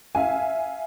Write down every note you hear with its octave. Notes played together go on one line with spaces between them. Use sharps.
E5 F5 G#5